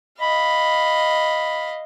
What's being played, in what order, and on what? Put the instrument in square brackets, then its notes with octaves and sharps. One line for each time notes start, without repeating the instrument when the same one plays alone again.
[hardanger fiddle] D#5 F5 [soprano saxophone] B5